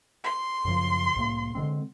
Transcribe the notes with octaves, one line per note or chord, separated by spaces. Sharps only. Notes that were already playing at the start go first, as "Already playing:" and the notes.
C6
F#2 C#3 F3
C2 A2 A#3
D3 G#3 C4